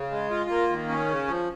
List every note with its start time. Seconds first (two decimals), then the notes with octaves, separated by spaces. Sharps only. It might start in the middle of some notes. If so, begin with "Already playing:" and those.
Already playing: C#3
0.11 G#3
0.30 F4
0.50 A#3
0.69 D#3
0.89 C#4
1.08 C#3
1.27 F3